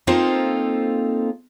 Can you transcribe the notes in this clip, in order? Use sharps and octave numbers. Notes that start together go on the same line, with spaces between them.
A#3 C4 D#4 F4 A4 C5